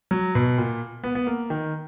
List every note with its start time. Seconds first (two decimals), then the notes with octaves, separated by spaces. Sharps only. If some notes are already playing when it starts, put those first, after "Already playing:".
0.11 F#3
0.35 B2
0.58 A#2
1.04 B3
1.15 B3
1.27 A#3
1.50 D#3